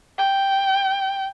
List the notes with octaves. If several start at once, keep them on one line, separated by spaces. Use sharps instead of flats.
G5